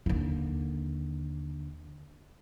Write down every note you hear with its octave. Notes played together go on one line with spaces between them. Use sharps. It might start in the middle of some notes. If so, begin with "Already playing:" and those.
D#2 D3